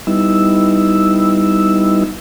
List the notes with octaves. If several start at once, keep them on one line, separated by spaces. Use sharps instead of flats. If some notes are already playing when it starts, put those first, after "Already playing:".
G3 B3 D#4 E4 E6